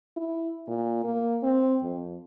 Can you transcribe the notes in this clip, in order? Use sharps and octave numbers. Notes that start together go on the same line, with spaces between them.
E4
A#2
A#3
C4
F2